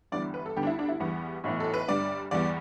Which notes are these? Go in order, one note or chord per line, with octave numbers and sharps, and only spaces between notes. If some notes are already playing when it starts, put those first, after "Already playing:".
G1 G2 E3 G3 B3 D5
B4
A4
D2 D3 G3 B3 G4
D4
E4
D4
E4
E2 E3 G3 B3
B1 A2 E3 B3
A4
B4
G1 G2 G3 D5
E2 E3 G3 B3 D5